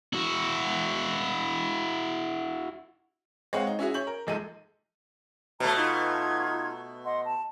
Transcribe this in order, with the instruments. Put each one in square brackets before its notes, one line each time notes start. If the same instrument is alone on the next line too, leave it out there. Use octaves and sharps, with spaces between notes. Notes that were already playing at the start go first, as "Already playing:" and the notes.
[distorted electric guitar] E4 F#4
[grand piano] G#3 C4 C#5 F5 F#5
D#4
C#4 E4 F#4 G#4
C#5 G6 F#7
A#4
D#1 A#1 G#3 D#4 A4 D#7
[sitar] B2 A3 [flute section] C#5 A5 A#5
[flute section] D#4 F4 G#6
D#5 F#5 C6
A5